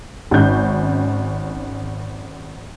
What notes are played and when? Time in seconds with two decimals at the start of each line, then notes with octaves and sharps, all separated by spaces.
0.31 G#1 C#4 D#4 G6